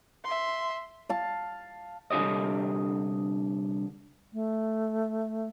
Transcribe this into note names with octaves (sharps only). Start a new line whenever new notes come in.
E5 C6
F5 A5
C2 D3 D4 G4 C#5 D#5
A3